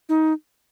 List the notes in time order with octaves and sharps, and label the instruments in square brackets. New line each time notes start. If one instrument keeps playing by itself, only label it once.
[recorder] D#4